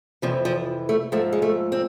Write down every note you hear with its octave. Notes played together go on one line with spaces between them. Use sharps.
F2 C3 E3 F3
F3
A3
G#2 F3 A3
G#3
A3
C4